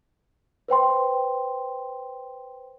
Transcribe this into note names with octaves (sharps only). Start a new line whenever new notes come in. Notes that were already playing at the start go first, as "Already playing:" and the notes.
B4 C5 G5 C6